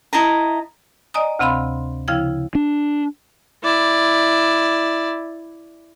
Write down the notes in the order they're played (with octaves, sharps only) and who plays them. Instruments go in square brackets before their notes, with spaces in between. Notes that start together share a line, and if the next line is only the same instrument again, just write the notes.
[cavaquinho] E4 D#5 A5 A#5
[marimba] D5 D#5 G#5 A#5 D#6
D2 C3 C4 F5 B5 C6
C#3 F3 E4 F5 G5 G#6
[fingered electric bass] D4
[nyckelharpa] E4 D5